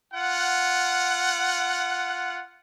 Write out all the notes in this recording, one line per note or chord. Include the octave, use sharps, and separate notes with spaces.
F4 F#5